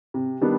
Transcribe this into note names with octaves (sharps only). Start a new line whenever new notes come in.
C3
D#3 G3 B3 D4